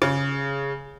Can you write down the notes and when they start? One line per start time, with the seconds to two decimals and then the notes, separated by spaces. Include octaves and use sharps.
0.02 C#3